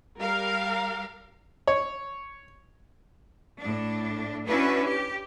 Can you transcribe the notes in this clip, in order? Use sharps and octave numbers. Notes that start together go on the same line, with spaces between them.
G3 A#4 F5
C#5
A2 D4
C#4 D4 E4 F#4 B4
G4